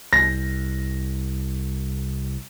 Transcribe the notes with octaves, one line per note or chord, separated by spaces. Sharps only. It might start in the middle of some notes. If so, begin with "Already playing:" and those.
C2 A#6